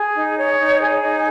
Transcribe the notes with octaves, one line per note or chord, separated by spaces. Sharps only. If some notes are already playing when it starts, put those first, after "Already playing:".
Already playing: G#4
D#4
C#5
D#4
G#4
D#4